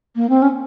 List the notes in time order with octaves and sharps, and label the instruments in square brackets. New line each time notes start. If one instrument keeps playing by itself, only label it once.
[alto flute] A#3
C4
C#4